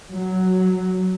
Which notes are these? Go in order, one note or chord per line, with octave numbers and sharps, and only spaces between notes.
F#3